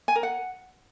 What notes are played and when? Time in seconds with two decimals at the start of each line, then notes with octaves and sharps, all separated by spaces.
0.08 G#5
0.16 A#4
0.23 F#5